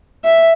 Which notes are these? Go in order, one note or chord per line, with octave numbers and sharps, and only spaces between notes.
E5